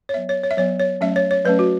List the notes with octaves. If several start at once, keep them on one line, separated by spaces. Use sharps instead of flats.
C#5
F#3 B3 E5
C#5
C#5
E5
F#3 B3 C#5
C#5
F#3 A3 C#4 E5
C#5
C#5
F#3 A3 C#4 B4
F#4